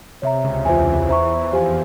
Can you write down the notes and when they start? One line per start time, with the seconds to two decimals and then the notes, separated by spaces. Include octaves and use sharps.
0.22 C3 C#5 E5 A#5
0.44 C#2 C#3
0.65 E2 E3 F4 C5 E5 G#5
1.09 C5 E5 A#5 C#6
1.52 F2 F3 G4 C5 F5 G#5